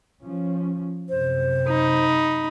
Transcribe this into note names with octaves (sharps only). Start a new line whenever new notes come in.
F3 C#4
F#2 C3 C5
D#4 B5